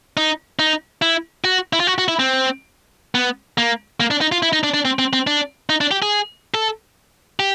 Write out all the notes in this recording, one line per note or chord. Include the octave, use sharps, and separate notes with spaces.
D#4
D#4
E4
F#4
E4
F4
F#4
F#4
E4
C4
B3
A#3
A#3
D4
D#4
F4
E4
D#4
D4
D4
C4
C4
C4
D4
D#4
D4
G4
G#4
A4
G4